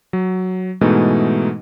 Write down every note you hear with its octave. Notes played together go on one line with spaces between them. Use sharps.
F#3
G#2 B2 E3 G#3 A3 D#4